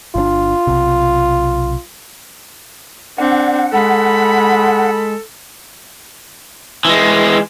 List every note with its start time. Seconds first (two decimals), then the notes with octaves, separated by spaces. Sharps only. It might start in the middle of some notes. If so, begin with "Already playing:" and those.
0.16 G1 D3 D4 F4
0.67 B1 C3
3.18 C4 D4 D5 F#5
3.73 G#3 A4 B5
6.85 E3 G#3